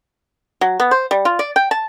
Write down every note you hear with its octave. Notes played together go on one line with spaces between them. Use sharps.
F#3
B3
C5
G3
F4
D5
G5
A5